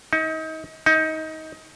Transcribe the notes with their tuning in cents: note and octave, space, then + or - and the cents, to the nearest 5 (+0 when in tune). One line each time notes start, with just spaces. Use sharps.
D#4 +35
D#4 +25